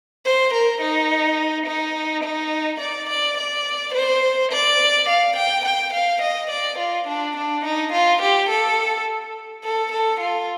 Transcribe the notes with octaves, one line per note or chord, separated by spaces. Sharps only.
C5
A#4
D#4
D#4
D#4
D5
D5
D5
C5
D5
F5
G5
G5
F5
D#5
D5
F4
D4
D4
D#4
F4
G4
A4
A4
A4
F4